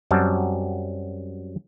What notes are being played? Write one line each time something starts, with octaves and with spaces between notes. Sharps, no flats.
F#2 F#3 G3 C4 A5